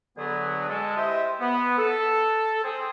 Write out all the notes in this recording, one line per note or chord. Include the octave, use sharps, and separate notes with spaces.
D3 F#3 B3 G#4
G#3 A4
E4 G4 C5 D#5 E5
B3
A4
C4 G#4